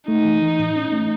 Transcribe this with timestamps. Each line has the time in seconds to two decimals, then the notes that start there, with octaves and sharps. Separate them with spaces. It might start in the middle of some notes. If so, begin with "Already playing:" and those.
0.08 A3 D#4
0.25 E3
0.42 E3
0.59 A2
0.76 C#4
0.92 A3